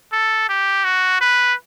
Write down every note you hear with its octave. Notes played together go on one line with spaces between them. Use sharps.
A4
G4
F#4
B4